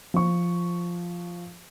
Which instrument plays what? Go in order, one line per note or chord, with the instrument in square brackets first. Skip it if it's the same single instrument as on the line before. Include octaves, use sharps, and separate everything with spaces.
[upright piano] F3 C#6